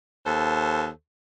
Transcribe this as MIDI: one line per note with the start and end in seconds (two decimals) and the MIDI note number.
0.24 0.87 39
0.24 0.87 69
0.24 0.87 72